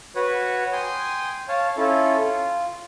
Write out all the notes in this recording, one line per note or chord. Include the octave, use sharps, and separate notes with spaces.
F#4 B4 C#5 F#5
G5 G#5 C6 D#6
C#5 F5 A5
C#4 E4 F4 A4
F4